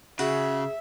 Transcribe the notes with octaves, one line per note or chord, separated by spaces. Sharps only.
C#3 F#4 G#4 E5